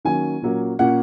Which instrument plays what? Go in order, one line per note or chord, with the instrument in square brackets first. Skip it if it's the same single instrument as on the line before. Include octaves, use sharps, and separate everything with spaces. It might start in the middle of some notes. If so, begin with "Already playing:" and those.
[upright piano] D#3 F#3 A#3 C#4 G#5
A#2 F#3 A#3 C#4
A#2 A#3 C#4 F#5